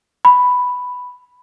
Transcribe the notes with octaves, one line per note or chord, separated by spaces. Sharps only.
B5